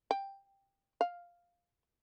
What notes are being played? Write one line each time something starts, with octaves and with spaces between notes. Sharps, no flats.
G5
F5